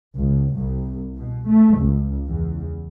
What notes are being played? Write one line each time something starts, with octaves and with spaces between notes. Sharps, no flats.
C#2
C2
B2
A3
C#2
E2